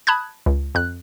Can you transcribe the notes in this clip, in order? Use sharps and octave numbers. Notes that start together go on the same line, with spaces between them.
A5 B5 D#6 F#6 G#6
C#2
F2 F#6